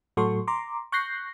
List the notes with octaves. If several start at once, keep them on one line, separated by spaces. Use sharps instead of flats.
A2 F#3 F#4 A4 C6 C#6
A#5 C6 D6
C#6 F#6 G6 A#6 C7